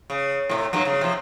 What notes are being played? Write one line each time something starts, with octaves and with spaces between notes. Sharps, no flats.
C#3
A2 C3
G2 F#3 A#3
C#3
C3 F3